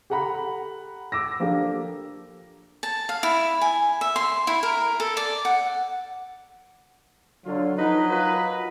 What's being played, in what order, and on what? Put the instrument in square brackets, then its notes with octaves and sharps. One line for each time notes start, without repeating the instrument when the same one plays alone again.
[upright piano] G4 A4 F#5 A#5 B5
D6 E6 A#6
F3 A#3 D4 G4 A4
[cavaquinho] A5
F5
E4
G#5
E5
C6
E4
A#4
A4
D5
F#5
[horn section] D3 F#3 F4
[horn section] F3 D#4 B4 [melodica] F#3 D#5
[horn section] F4 A#4 B4